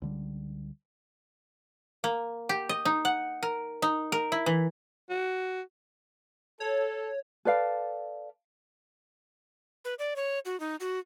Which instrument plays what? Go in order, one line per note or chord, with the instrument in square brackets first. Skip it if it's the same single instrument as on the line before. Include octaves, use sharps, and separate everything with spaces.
[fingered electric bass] C#2 D3 G3
[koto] A#3
G4
D#5
D#4
F#5
A#4
D#4
A#4
E4
E3
[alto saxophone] F#4
[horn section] A4 [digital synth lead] C#5
[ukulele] A4 B4 D5 F5
[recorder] B4
D5
C#5
F#4
D#4
F#4